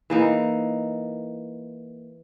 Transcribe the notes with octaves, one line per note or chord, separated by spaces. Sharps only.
E3 A#3 D#4